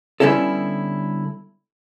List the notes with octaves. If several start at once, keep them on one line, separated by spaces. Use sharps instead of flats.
D3 G3 B3 C#4 E4 A4